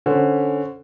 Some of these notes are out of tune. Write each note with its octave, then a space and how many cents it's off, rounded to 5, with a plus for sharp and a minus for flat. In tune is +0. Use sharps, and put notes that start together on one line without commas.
D3 +0 C#4 +0 C5 +5